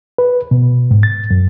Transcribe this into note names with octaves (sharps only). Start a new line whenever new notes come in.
B4
B2
G#2
A6
F#2